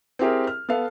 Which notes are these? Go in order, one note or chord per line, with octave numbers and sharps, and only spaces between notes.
C4 E4 G4 G#4 A#4
F6
B3 A4 F5